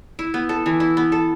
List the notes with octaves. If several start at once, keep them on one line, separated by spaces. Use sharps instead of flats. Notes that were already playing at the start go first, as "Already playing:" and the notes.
E4
B3
A4
E3
E4
B3
A4